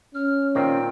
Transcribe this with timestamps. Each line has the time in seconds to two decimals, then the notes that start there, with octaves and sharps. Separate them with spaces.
0.15 C#4 F6
0.55 A#2 D#3 C4 G5